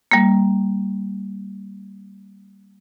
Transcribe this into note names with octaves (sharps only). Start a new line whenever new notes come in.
G3 A#3